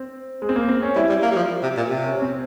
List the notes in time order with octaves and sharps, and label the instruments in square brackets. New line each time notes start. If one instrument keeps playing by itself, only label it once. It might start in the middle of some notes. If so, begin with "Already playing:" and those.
Already playing: [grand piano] C4
G#3
C4
A#3
C4
C#4
[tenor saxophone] G3 [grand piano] E4
[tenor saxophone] G3
A#3
G3
F3
C3
A#2
C3
[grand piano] C#4
C#4
C4